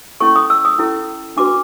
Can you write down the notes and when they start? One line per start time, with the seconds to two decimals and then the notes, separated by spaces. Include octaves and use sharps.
0.20 C#4 E4 A4 C#6
0.36 D#6
0.50 E6
0.65 D#6
0.79 C#4 E4 A4
1.37 D4 F#4 B4 D6